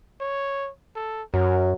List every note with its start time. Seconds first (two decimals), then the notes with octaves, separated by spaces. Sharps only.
0.20 C#5
0.96 A4
1.34 F#2 F#3 A#4